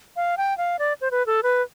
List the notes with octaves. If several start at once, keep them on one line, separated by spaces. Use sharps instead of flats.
F5
G5
F5
D5
C5
B4
A4
B4